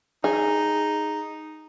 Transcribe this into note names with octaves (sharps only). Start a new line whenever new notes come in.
D#4 G#4